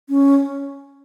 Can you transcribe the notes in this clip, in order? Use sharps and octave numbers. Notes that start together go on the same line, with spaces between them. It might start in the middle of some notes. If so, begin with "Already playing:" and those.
C#4